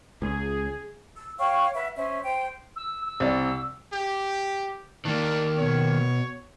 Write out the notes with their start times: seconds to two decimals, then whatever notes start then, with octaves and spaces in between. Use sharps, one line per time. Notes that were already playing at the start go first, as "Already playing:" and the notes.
0.22 C#2 G#4
1.14 E6
1.38 C#5 F5 G5 C#6
1.75 B4 E5 F#5
1.96 C#4 C5 E5
2.23 C5 G5
2.76 E6
3.07 E6
3.20 C2 D5
3.93 G4
5.05 D#3 A#3 D4
5.58 B2 C#5